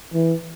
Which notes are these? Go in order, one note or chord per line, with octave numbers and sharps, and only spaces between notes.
E3